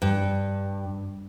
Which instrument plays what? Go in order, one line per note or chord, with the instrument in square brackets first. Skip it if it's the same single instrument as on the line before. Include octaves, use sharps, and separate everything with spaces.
[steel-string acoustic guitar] G2